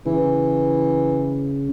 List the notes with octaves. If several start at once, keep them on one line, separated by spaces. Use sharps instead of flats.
C#3 E3